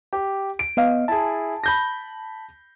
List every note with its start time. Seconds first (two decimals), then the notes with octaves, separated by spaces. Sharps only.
0.13 G4
0.59 D7
0.77 B3 D#5 F5
1.08 E4 G#4 A5
1.64 B5 G6 A#6